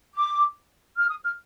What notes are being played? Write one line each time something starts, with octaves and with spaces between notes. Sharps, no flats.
D6
F6
D#6
F6